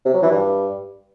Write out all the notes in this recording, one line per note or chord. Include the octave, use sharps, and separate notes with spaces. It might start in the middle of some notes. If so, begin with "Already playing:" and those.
C3
F#3
E3
G2